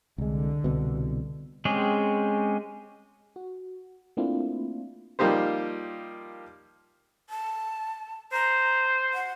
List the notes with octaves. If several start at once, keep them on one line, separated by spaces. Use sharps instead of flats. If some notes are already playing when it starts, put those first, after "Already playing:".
C2 D3 G#3
C2 B2
G#3 C4 C#4 G4 G#4
F#4
A3 A#3 C4 D4 E4 F4
F3 G3 A#3 D#4 G4 C5
A5
C5 A#5
F#5